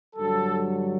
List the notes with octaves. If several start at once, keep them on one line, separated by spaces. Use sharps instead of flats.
G2 D3 F#3 A4